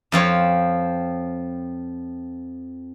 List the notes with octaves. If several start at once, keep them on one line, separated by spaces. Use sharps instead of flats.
F2 F3 C4 C#5